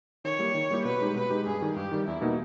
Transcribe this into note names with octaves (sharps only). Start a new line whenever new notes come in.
D#3 C#5
G3 A#3 E4 G4
D#3
G3 A#3 E4 G4
B2 B4
G#3 D#4 G4
B2 B4
G#3 D#4 G4
G2 G#4
D#3 G3
G2 G4
D#3 G3
E2 E4
B2 A#3 D#4